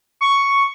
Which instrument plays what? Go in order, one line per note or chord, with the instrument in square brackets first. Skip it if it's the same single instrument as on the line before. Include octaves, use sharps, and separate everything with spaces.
[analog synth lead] C#6